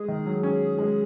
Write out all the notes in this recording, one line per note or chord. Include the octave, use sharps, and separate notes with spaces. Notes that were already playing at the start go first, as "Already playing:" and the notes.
Already playing: G#3 G#4
D#3
F#3
C#4
G#3